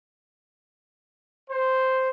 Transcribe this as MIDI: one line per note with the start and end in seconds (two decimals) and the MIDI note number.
1.50 2.10 72